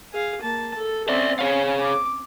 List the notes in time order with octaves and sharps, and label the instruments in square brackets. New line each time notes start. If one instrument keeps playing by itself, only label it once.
[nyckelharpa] G#4 F5
A#3 A5
A4
[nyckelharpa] C4 C#4 [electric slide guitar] D5 E5
[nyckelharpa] C#4 [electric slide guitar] G#4 C#5 F5
[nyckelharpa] D6